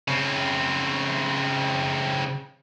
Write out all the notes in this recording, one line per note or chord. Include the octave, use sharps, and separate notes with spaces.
C#3 C4